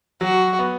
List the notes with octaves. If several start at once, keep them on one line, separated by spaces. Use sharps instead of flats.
F#3 F#4
B3